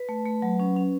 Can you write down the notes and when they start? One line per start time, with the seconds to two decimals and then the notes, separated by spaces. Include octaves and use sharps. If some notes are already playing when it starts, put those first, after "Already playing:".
Already playing: B4
0.09 A3
0.26 A3
0.42 F#3
0.60 C#4
0.76 C#4